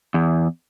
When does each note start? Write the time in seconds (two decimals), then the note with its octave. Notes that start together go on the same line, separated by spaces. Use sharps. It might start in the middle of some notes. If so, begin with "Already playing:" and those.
0.14 E2